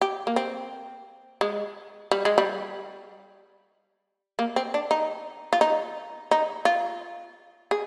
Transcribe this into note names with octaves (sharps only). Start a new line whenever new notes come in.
G4
A#3
C4
G#3
G3
G#3
G3
A#3
C4
D4
D#4
F4
D#4
D#4
F4
G#4